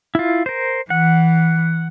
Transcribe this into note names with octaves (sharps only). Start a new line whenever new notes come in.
E4 F4
A#4 C5
E3 F#5